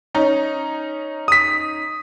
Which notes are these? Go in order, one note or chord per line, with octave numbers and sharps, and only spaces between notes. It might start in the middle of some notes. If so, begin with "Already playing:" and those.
C#4 D#4
D#6 B6